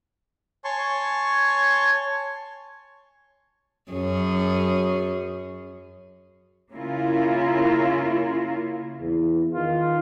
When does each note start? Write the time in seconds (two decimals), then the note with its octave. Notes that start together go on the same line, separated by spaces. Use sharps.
0.64 C#5 G#5 A5 C6 C#6
3.92 F#2 C#4 G#4
6.72 C#3 A#3 C#4 E4 F4 A#4
9.00 E2
9.54 D#3 F4